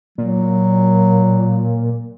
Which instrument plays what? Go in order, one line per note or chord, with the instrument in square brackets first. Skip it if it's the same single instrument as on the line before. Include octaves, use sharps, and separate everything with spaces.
[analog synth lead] A#2 [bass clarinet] F#3